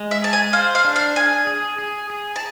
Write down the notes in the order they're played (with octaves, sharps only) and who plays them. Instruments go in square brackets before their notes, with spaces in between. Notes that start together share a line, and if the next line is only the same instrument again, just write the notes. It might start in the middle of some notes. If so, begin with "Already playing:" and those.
Already playing: [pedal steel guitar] G#3
[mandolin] E5
[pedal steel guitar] G#4 [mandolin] A5
[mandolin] G#5
[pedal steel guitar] C5 [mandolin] F5
[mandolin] F5
[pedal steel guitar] D4
[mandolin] F5
[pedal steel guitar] G#4 [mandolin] G#5
[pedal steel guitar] G#4
G#4
G#4
[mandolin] A5